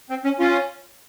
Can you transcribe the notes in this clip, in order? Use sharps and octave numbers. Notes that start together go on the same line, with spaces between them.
C4
C#4
C#4 F4